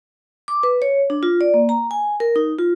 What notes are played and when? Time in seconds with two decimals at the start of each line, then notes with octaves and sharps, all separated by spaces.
0.48 D6
0.63 B4
0.82 C#5
1.10 D4
1.23 F4
1.41 D5
1.54 A#3
1.69 A#5
1.91 G#5
2.20 A#4
2.36 D#4
2.59 F4